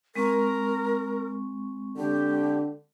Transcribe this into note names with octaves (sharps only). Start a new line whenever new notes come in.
G#3 C4 A#4 C#6
D3 G4